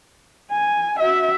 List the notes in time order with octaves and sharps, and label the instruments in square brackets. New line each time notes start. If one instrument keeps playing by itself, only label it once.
[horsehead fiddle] G#5
F#4 E5